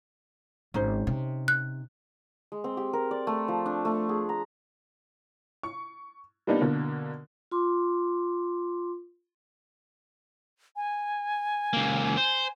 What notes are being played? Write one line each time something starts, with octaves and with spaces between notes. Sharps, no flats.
G#1 C#4 D#4 C5
C3
F#6
G#3
C4
G4
A#4
D5
A3
F3
D4
A3
G#4
A#5
C#6
G3 A#3 B3 D4 D#4
B2 D3 A#3
F4 C6 D6
G#5
C#2 A#3
C5